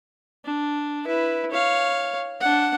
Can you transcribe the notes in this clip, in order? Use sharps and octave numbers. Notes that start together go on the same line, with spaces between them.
D4
E4 B4
C#5 F5
D4 F#5